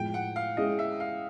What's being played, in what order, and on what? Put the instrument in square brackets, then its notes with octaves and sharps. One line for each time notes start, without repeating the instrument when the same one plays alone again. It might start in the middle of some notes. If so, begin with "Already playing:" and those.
Already playing: [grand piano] A2 F3 G#3 [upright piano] G5
[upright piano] F#5
F5
[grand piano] G#3 C#4 E4 G#4 [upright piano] D#5
[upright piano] E5
F5